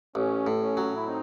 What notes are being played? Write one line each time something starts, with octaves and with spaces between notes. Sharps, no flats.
A1 C#4
A2
C#4
F#3
E4
C4 D#4